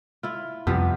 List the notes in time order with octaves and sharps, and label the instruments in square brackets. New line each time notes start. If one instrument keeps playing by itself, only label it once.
[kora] E4 F4
[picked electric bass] F2 G3 [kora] C3 F3 B3